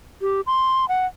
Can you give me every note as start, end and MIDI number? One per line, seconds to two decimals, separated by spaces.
0.22 0.41 67
0.47 0.88 84
0.89 1.06 78